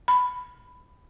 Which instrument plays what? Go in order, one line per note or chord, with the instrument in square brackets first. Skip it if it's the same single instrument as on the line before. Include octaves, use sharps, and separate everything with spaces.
[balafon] B5